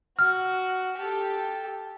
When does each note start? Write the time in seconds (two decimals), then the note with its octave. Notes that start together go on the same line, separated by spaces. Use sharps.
0.19 F#4 F6
0.98 G4 A4